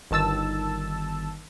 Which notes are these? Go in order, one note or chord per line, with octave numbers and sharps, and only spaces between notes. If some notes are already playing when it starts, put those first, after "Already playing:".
G1 D#3 A5 E6 A6